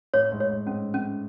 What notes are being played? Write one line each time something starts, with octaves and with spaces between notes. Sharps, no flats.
A2 C#5
G#2
C#5
G#2
G#2 C#4
C#4